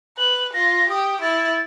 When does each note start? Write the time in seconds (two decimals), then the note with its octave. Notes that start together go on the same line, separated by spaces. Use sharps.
0.18 B4 F#7
0.54 F4 A#6
0.90 G4 D#6
1.22 E4 A6